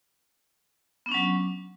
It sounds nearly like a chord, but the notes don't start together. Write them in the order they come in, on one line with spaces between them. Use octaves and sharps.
B3 D4 C#4 F#3